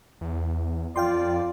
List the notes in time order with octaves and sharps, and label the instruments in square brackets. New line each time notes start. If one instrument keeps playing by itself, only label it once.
[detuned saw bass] E2
[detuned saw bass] F2 [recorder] F4 [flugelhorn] D5 [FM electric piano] F5 G5 C6